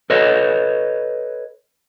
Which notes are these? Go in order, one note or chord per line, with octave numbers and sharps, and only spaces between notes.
A4 B4 C#5 D#5